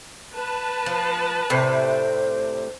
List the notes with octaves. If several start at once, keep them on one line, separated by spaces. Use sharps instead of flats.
B4 A5
F3
A2 C3 D4 C5